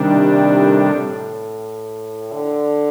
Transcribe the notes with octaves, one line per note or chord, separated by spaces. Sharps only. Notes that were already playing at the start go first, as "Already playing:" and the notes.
Already playing: C3 D#3 G3 D4
A#2
A2
D3